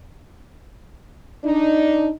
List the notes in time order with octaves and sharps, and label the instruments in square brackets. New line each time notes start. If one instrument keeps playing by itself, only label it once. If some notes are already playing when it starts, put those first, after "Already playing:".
[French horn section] D4 D#4